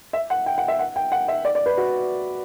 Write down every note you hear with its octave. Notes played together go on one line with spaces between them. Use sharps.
E5
F#5
G5
F#5
E5
F#5
G5
F#5
E5
D5
D5
B4
F#4